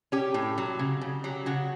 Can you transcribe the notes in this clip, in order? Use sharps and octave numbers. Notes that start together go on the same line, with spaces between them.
C#4 G4
A2
F#3
C#3
C#3
F#3 G4
C#3 F#4